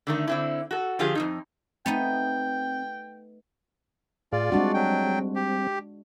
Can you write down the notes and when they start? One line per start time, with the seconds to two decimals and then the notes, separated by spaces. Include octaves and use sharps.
0.07 D3 D#3 A3
0.28 D3 C4 E4
0.71 F#4 A4
0.99 D3 F3 F4 G4 G#4
1.15 F2 D#3 D#4
1.86 A3 B3 C4 D#4 G5
4.33 A2 F4 G#4 D5 F5
4.52 G3 G#3 C4 D4 F#4
4.74 F#3 G5
5.35 G4